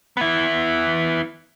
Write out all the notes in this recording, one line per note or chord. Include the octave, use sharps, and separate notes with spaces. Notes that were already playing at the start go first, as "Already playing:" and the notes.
B3 E4